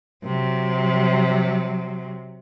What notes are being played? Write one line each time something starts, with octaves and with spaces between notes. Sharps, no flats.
C3 F#3